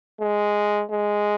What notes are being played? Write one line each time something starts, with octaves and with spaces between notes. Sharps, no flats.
G#3
G#3